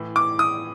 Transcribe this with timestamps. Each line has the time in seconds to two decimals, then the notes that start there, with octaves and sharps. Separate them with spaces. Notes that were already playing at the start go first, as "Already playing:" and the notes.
Already playing: A2 E3
0.16 D6
0.39 D#6